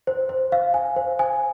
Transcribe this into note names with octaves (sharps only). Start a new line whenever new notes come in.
C5
C5
F5
G#5
C5
G#5